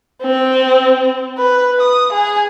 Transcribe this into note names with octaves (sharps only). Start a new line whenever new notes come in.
C4
B4
D#6
G#4 G#5